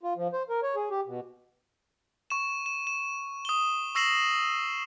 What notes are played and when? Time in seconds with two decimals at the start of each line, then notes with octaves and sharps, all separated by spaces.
0.03 F4
0.16 F3
0.33 C5
0.49 A#4
0.63 C#5
0.75 G#4
0.90 G4
1.07 B2
2.30 C#6 E7
2.66 E7
2.87 E7
3.45 D#6 G7
3.95 C#6 E6 A#6 C7 E7 F#7